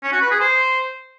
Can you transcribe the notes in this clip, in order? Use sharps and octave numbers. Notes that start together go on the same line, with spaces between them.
C#4
F#4
B4
G#4
C5